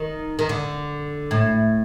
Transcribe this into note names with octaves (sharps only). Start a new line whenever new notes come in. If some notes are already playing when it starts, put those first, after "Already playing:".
Already playing: D#3
D#3
D3
A2